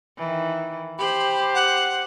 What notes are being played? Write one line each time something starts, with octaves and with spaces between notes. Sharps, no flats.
D#3 E3
G4 C5 B5
F#5